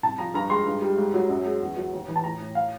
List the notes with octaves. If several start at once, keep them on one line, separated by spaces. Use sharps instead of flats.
C2 A5
F3 A#5
G2 A#5
G#3 C6
G2
G3
G#2
F#3
F#2
G#3
E2
F#3
D#2
E3
A5
A2 A#5
A2
F5